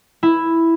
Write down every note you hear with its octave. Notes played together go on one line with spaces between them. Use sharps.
E4